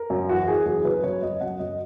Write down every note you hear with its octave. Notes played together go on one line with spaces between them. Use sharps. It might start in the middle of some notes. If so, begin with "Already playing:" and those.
Already playing: A#4
F#2
E3 F#4
E3 G#4
F#2 G#4
F#2 B4
F#2 C#5
F#2 D#5
F#2 F#5
F#2 D#5